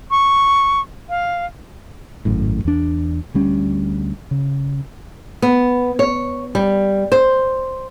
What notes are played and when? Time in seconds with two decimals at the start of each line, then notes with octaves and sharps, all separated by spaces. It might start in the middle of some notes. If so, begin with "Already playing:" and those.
0.11 C#6
1.09 F5
2.25 G#1 F#2 A2
2.65 E2 D4
3.34 D2 G3 C#4
4.31 C#3
5.42 B3
5.99 C#5
6.55 G3
7.12 C5